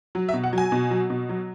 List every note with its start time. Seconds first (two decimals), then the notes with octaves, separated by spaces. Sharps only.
0.15 F#3
0.29 E5
0.34 B2
0.44 F#5
0.53 F#3
0.58 G#5
0.72 B2
0.91 F#3
1.10 B2
1.29 F#3